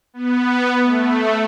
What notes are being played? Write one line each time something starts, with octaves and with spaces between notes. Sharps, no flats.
B3
A3